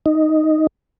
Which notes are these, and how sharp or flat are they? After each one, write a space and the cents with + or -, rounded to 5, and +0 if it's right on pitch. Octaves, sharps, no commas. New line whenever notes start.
D#4 +0